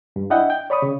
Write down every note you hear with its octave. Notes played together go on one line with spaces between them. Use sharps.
G2
D4 E4 D#5 F#5 G5
G5
C#5 D5 B5 C#6 D#6
C#3